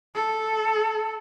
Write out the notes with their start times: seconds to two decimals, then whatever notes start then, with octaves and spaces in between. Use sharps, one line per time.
0.15 A4